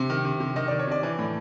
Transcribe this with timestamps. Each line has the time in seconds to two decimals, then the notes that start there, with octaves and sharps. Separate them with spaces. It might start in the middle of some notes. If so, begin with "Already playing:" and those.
Already playing: C3
0.10 D#3
0.25 C3
0.40 C3
0.56 D#3 D#5
0.68 D#3 D5
0.79 C#5
0.87 C3 D5
1.03 E3
1.19 A2